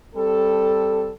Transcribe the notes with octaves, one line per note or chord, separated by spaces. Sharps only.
G3 C4 A4